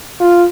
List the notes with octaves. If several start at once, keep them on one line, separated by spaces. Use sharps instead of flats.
F4